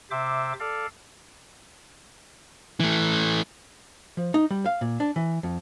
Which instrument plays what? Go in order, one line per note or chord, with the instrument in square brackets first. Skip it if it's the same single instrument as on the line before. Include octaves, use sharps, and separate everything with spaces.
[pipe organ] C3 C5 E5 D6
A4 D5 F5
[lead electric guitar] E3 A3
[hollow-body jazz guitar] F3
D#4
G3
F5
A#2
D4
E3
F2